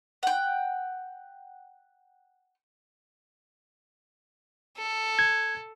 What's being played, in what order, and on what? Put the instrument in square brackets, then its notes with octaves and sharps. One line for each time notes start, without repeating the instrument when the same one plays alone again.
[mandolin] F#5 G5
[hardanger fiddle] A4
[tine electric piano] G#6